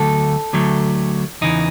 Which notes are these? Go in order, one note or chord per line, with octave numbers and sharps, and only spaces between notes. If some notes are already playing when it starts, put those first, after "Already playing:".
Already playing: D2 D3 F#3 A3 A4
D2 D3 F#3 A3
E2 C#3 E3 D#4